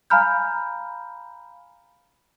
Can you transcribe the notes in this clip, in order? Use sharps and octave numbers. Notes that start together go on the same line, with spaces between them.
F5 G#5 A#5 B5 F6 G6